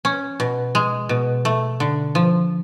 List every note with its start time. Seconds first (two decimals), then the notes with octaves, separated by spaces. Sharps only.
0.05 C#4
0.40 B2
0.75 G#3
1.09 B2
1.45 A3
1.80 D3
2.15 F3